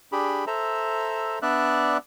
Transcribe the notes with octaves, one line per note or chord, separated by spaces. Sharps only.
D4 G4 G#4 B5
A4 C5 E5 A#5
B3 D4 D5 E5 F#6